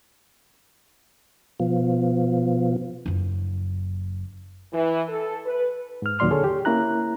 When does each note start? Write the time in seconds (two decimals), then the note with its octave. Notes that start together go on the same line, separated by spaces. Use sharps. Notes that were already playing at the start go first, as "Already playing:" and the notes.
1.60 B2 F3
3.06 F#1 F#2
4.73 E3
5.08 A4
5.46 B4
6.02 G#2 F6
6.19 D#2 A#2 F#3 D5 C6 F6
6.30 D3 G#4 A4 C#5
6.44 G4
6.65 A#3 C#4 E4 A#5 F#6